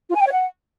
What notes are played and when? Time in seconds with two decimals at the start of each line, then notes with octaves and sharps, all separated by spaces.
0.10 F4
0.15 G#5
0.21 G5
0.26 C#5
0.32 F#5